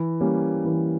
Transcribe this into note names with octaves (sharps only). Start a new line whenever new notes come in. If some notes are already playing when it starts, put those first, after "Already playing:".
Already playing: E3
G3 A#3 C#4
E3